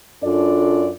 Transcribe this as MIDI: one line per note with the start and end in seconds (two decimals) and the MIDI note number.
0.23 0.92 42
0.23 0.92 62
0.23 0.92 65
0.23 0.92 69
0.23 0.92 74